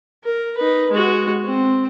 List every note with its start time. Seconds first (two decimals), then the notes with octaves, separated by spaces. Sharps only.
0.24 A#4
0.57 D#4 B4
0.91 G#3 F#4
1.44 C4